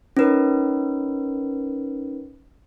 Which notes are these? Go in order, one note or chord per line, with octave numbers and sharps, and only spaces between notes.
C#4 D#4 A#4 B4